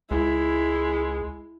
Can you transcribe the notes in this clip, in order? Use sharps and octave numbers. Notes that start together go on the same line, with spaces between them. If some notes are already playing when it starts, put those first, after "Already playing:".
C#2 G#3 E4